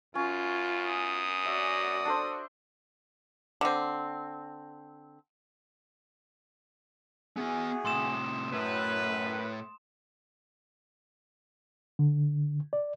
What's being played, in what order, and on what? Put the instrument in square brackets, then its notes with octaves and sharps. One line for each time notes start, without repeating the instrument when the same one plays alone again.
[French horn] F#2 [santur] C#4 [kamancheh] F4
[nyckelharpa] D#6
[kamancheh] F#4 D5 [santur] E5
[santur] D4 A4 C5
[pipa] D3 C4
[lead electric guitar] B3 G#5 [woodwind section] E4 F#4 G#4
[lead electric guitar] A2 C3 [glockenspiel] C6 D#6 E7
[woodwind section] F#2 [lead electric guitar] A2 [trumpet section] B4
[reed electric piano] D3
D5